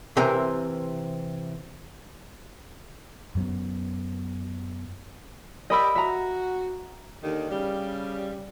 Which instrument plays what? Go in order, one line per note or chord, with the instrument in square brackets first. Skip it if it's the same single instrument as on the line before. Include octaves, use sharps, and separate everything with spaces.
[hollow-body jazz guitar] C3 E3 C4 A#4 A#5
[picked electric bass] F#2 F#3 B3
[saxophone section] G4 A#4 D5 [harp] D#5 B5 E6
[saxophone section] F#4 [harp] E5 A#5
[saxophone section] D#2 D3 D#3
C#3 G3